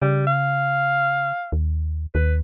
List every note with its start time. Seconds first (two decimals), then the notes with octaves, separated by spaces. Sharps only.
0.02 C#3 G3
0.27 F5
1.52 D#2
2.15 D#2 B4